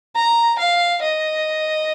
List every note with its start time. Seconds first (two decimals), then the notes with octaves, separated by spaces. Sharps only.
0.16 A#5
0.58 F5
1.02 D#5